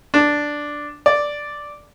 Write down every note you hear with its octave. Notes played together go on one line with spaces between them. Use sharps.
D4
D5